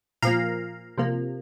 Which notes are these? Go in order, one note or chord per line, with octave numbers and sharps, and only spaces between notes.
A#2 F3 A#3 F5 A#5
C3 F3 A#3